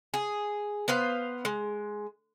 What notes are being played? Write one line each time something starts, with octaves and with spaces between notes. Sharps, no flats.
G#4
B3 B4 C5 F5
G#3